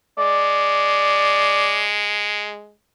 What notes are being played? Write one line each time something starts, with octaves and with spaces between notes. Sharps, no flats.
G#3 D5